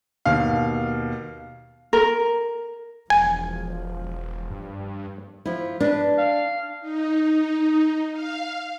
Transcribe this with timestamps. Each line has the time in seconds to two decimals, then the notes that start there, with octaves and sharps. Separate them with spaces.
0.25 D#2 B2 F5
1.93 A#4
3.10 E1 F3 G#5
4.51 G2
5.45 F3 E4
5.80 D4 B4
6.18 F5
6.80 D#4
8.11 F5